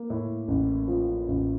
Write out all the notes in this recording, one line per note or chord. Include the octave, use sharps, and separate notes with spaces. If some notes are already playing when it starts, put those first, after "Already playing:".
Already playing: A#3
A2
A1
F3
A1